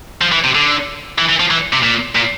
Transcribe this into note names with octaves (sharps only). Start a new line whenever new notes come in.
F3
E3
C3
D3
E3
E3
F3
E3
C3
A#2
A#2